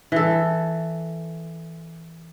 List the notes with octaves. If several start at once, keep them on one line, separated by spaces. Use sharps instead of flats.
E3 A4